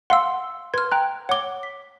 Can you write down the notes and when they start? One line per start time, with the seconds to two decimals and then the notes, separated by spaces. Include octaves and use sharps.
0.10 F5 F#5 C6 E6
0.74 B4 C6 F6 G#6
0.92 G5 A#5 F#6
1.29 C#5 F#5 D6 G7
1.63 B6